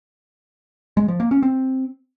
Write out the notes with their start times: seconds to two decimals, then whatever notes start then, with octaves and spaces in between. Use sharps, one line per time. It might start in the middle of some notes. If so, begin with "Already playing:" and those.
0.97 G#3
1.08 F3
1.20 A#3
1.31 C#4
1.43 C4